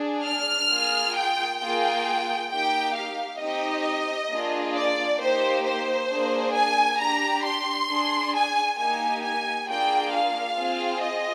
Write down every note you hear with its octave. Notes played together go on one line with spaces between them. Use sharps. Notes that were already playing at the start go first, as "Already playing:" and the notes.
Already playing: D4 G#4
F6
A#3 F4 G#4
G5
A#3 F4 G#4 G5
A#3 D#4 G4 G5
F5
C4 D#4 G4 D#5
A#3 D4 F4 G#4
D5
A#3 D#4 G4 C5
C5
A#3 D4 G#4
G#5
D4 G4 A#5
C6
D4 G#4
G#5
A#3 D#4 G4 G#5
G#5
A#3 D4 F4 G#4 G5
F5
C4 F4 G#4
D#5